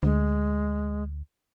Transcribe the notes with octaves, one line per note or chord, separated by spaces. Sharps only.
D2 G#3